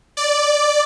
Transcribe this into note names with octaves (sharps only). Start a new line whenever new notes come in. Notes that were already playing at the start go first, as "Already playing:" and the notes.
D5